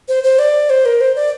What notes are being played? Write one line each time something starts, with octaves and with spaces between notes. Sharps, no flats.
C5
C5
D5
C5
A#4
C5
D5